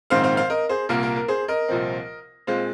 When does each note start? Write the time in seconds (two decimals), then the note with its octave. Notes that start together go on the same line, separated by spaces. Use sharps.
0.10 A#1 G#2 D#3 C4 C5 F5
0.24 C5 F5
0.37 C5 F5
0.50 A#4 D#5
0.69 G#4 C5
0.89 C2 A#2 A#3 A#4
1.03 A#4
1.16 A#4
1.28 G#4 C5
1.48 A#4 D#5
1.68 C2 A#2 F3 C4
2.47 A#2 G#3 C4 C5 F5